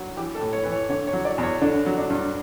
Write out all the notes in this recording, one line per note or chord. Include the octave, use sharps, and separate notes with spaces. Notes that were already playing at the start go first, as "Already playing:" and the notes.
Already playing: G2 F#3
E3 G4
A4
A2
C#5
E3 B4
C#5
D3 C#5
C#5
F#3
D5
E2
C#5
D3 D4
F#3
D4
G2